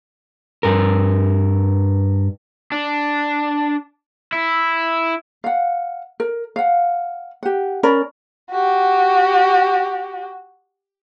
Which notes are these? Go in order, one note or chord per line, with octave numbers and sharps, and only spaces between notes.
G2 A#4
D4
E4
F5 F#5
A#4
F5 F#5
G4 F#5
C#4 A#4 D5 B5
F#4 G4